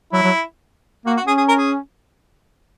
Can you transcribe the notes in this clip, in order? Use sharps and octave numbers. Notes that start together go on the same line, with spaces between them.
F#3 E4
F#3
A#3 F#4
F#4
C#4 G#4
G#4
A#4
G#4